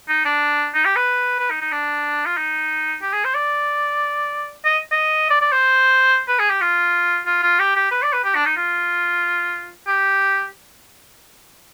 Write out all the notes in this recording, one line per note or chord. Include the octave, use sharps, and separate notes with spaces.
D#4
D4
D#4
G4
B4
B4
D#4
D#4
D4
F4
D#4
G4
G#4
C5
D5
D#5
D#5
D5
D5
C5
B4
G#4
G4
F4
F4
F4
G4
G4
B4
D5
B4
G4
D4
D#4
F4
G4